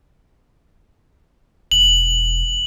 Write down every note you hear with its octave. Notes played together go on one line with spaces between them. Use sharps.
E1 F#7